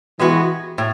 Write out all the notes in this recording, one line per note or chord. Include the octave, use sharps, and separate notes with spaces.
E3 G#3 B3 F#4 B4
A2